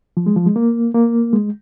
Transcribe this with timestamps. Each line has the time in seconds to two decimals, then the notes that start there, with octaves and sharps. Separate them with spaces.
0.17 F3
0.26 G#3
0.36 F3
0.46 G#3
0.56 A#3
0.94 A#3
1.33 G#3